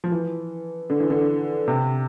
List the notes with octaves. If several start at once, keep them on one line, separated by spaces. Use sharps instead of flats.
F3
E3
D3
E3
D3
C3